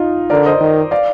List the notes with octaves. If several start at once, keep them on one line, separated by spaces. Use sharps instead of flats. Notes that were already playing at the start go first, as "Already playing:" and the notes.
Already playing: D#4 F4
D3 A#4 D5
C5 D#5
D#3
D5 F5